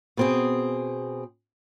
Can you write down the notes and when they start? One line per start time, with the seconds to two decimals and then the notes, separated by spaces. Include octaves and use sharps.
0.17 B2 C4 G#4